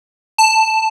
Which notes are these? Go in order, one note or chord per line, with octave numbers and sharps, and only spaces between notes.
A5